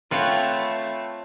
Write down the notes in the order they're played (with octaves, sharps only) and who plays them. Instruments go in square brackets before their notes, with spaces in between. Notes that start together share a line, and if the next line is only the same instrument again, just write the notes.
[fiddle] A3 [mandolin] C4 B4 F#5 [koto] F4 C#5